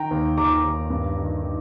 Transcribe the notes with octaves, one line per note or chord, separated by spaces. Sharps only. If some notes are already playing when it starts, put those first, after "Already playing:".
Already playing: D#3 G5 A#5
D#2
D#3 A#5 D6
D#2
G2
D#3
D#3